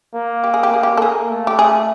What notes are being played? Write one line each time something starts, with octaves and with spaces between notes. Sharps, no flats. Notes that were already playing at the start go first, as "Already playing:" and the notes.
A#3
G4
G#4
G4
A#3 G#4
G4
A4
A#3 G#4
A3
G4
G#4